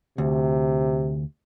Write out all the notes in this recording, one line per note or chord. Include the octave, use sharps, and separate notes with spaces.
D2 C3